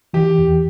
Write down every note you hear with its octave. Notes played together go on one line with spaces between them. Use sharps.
E3 G4
E2